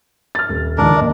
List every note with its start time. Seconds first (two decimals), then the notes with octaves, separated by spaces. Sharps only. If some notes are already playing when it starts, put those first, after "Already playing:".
0.35 F6 A6
0.49 D#1
0.78 C#2 D#3 D4 A#4
0.97 D#2 D#5